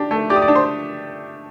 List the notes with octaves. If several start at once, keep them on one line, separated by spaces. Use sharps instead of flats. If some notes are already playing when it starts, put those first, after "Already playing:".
Already playing: D4 G4
A3
G4 D5 D6
D#6
D5 D6
D4
C5 C6